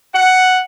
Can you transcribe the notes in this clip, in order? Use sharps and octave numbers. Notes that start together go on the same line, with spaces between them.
F#5